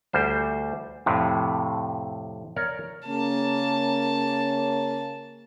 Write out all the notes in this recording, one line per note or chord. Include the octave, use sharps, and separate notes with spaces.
D2 G3 C5
F2 A2 C3
A#4 C#5 D5
C#3 A#3 C#4 A5